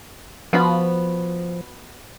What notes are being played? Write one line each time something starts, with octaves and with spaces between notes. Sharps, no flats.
F3 B3 F#4 B5